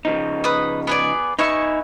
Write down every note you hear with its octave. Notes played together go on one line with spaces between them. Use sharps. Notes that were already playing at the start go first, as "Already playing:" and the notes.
C#3 F3 D#4
B4 D#6
B3 G#4 D5
B3 D#4 E5 G#5 C#6